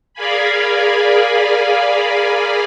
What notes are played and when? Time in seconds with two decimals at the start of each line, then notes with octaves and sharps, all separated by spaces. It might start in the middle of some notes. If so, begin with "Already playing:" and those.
0.14 G#4 A#4 D5 F5 G#5 B5